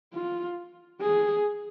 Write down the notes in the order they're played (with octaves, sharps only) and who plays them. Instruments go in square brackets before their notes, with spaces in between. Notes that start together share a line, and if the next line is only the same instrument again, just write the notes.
[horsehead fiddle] F4
G#4